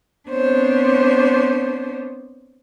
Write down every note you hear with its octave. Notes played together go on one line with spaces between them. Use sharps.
B3 C4 D4 C5 C#5